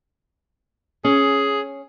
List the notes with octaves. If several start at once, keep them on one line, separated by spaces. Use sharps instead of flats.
C#4 G#4